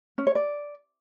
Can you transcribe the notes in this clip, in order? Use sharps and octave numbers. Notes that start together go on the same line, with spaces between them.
C#4
C#5
D5